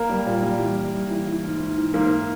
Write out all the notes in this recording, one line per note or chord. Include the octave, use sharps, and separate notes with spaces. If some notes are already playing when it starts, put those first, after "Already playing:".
Already playing: A#3 A#4
G3
A#2
G3
E3
G3
G3
E3
E3
G#2
G#2
E3
G#2 A#3 A#4